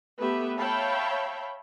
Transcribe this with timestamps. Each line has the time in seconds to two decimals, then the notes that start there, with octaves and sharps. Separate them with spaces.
0.18 A3 B3 G4 B4 E5
0.58 C#5 E5 F5 G5 A5 B5